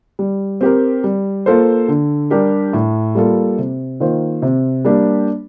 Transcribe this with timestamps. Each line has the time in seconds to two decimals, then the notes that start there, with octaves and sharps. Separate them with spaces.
0.19 G3
0.61 C4 G4 A#4
1.04 G3
1.46 A#3 F4 A4 C5
1.88 D3
2.30 G3 D4 G4 A#4
2.73 A2
3.15 G3 A#3 F4 A4
3.58 C3
4.00 D#3 A#3 F4 C5
4.42 C3
4.85 G3 A#3 D4 G4